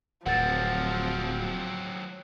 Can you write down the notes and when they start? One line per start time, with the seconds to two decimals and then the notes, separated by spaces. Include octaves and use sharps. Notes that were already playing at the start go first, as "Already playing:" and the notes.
0.26 D1 F3 F#3 C4 F#5 A6